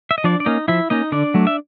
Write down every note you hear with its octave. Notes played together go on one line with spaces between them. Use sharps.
E5
D#5
F3 D4 D5
D5
A#3 C#4 D#4 D#5
F3 E4 E5
A#3 C#4 D#4 D#5
D3 D4 D5
F#3 A3
E5